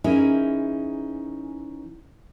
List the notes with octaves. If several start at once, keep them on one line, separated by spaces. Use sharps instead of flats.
E3 C#4 D#4 E4 G#4 A#4